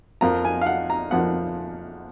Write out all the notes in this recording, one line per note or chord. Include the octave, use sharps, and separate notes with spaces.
F2 F3 A#3 A#5
G#5
F5
F#5
A#5
F2 F3 A#3 F#5